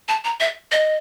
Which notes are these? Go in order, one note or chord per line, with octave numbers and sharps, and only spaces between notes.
A5
A#5
E5
D#5